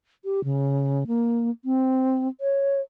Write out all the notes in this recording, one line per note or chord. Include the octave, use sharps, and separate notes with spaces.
G4
C#3
A#3
C4
C#5